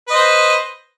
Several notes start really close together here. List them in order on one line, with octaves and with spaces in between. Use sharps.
B4 D#5 C5